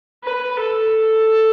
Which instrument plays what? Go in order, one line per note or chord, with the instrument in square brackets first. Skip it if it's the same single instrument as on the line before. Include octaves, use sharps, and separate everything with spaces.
[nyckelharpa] B4
A4